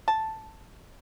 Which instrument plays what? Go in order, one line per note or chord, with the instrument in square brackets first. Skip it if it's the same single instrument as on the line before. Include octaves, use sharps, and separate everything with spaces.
[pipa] A5